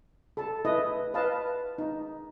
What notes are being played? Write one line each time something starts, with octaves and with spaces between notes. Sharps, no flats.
A4 A5
E4 B4 D#5
B4 D#5 F5 A5
D#4